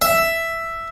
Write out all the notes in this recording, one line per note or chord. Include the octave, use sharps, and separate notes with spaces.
E5